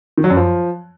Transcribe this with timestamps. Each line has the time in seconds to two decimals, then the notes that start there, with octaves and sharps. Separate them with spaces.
0.18 D#3
0.24 F#3
0.30 F#2
0.37 F3